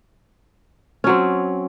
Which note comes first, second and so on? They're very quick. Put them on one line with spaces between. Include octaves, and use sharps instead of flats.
C#4 F#3 C4